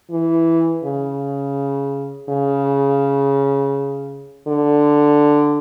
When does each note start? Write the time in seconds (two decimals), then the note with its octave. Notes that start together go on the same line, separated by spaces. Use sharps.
0.11 E3
0.84 C#3
2.29 C#3
4.48 D3